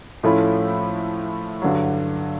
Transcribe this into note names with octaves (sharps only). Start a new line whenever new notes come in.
A2 F3 A3 C#4 E4
G2 D3 F#3